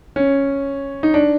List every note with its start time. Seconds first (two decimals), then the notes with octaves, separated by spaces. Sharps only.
0.16 C#4
1.03 D#4
1.14 D4